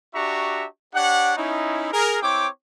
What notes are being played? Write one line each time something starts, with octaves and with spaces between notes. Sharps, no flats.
D4 F#4 G4 E5 A#5 C#6
D4 G4 C#5 F#5
C#4 D#4 E4
G#4 A#4
C4 E4 C#5 G5 D6